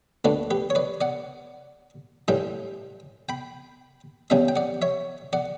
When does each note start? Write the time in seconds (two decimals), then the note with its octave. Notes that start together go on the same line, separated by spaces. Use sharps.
0.25 D2 D3 A3 B4 D5
0.51 G4 B4
0.70 C#5
0.75 B4 D5
1.01 D5 F#5
2.28 A2 E3 G3 E5 G5
3.29 G5 B5
4.30 E2 C#3 G3 E5 G5
4.48 G5
4.56 D5 F#5
4.82 C#5 E5
5.33 D5 F#5